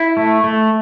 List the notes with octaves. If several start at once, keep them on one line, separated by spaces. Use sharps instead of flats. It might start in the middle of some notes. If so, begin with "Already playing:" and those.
Already playing: E4
A3
A3